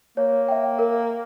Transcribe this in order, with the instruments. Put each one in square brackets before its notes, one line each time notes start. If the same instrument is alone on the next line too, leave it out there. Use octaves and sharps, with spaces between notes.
[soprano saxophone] A#3 [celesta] C#5
[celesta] E5 G5
A#4